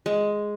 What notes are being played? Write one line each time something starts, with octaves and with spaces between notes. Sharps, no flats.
G#3